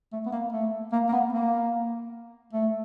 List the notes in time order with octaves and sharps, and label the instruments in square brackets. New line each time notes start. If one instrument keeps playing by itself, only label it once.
[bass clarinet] A3
B3
A#3
A3
A#3
A#3
B3
A#3
A3